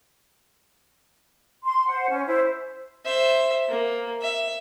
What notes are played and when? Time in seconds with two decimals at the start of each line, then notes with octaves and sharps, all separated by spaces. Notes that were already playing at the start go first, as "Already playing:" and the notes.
1.65 C6
1.87 C5 F#5
2.10 C#4
2.27 E4 C5
3.05 C5 E5
3.69 A#3
4.22 E5